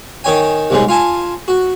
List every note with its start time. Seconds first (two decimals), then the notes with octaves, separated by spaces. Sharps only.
0.24 D#3 D#4 C#5 G5 G#5
0.70 C2 G#2 C3 G#3 C#4
0.88 F4 G#5 A5
1.48 F#4